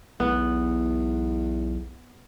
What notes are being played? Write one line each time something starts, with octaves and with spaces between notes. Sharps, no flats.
B1 E2 B3